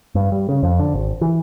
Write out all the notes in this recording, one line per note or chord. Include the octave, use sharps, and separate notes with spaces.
G2
G3
C#3
F2
D3
G#1
E3